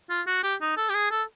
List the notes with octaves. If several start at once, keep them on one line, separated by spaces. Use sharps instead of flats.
F4
F#4
G4
D#4
A4
G4
G#4
A4